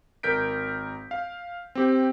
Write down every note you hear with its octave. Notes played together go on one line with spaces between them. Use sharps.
G#1 A#4 G6 B6 D7
F5
C4 G4